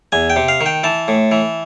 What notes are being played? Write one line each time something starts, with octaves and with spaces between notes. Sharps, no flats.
E2 G#5
G5
C3
F5
D#3
G5
E3 A5
A2
E3